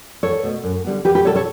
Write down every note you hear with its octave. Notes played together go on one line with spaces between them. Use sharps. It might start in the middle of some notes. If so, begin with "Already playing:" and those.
E2 A4 C#5
B2 A3
F#2
D3 G3 B3
E2 G4 B4
G4 B4
B2 G3 A4 C#5
A4 C#5